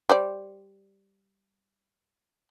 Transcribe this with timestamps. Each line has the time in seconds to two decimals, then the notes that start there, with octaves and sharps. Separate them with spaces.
0.09 G3 C5 D5